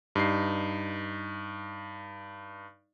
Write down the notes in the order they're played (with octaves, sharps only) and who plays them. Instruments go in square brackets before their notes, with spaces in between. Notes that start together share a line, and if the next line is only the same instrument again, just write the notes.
[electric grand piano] G2 D#4 C7